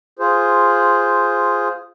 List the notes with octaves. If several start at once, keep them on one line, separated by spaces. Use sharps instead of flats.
F4 G#4 C5